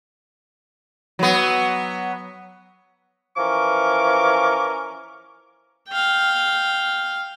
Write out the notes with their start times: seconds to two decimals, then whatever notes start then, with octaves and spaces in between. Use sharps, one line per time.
1.19 F#3 B3
3.37 E3 F3 C#4 A#4 C#6 D6
5.89 F5 G5